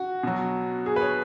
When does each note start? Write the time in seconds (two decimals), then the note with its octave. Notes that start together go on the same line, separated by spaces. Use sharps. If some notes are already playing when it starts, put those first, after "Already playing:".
Already playing: F#4
0.23 B2 F#3
0.86 G#4
0.96 B4
1.01 C#5